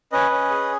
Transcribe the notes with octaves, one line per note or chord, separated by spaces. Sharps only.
C#4 B4 D#5
C#4
G#4